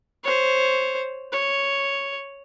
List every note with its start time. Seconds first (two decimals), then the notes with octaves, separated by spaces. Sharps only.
0.24 C5 C#5
1.32 C#5